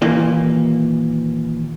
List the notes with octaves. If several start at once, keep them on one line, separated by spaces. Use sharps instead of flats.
D#2 A#2 E3 A#3